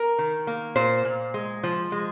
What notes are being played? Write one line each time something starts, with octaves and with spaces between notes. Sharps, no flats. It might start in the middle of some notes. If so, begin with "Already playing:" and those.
Already playing: A#4
D#3
A#3
A#2 C5
A#2
G#3
F3
G#3